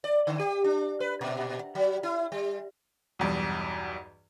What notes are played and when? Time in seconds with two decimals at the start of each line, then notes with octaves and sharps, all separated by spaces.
0.04 D5
0.27 D3
0.40 G4
0.64 D4
1.00 B4
1.21 A#2
1.75 F#3
2.03 E4
2.32 G3
3.19 B1 E2 G2